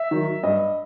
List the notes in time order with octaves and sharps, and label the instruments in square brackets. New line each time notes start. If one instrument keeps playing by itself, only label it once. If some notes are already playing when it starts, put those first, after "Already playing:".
Already playing: [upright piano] E5
D#3 F#3
G2 D#5